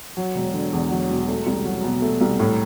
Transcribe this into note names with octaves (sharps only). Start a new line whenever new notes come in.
F#3
E1
D3
E2
F#3
E1
A3
C2
F#3
B2
A3
C2
A2